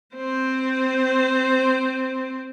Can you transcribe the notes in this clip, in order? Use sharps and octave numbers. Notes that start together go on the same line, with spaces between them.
C4 C5